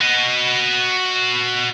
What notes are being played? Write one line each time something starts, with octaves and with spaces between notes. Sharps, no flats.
F#4 D#5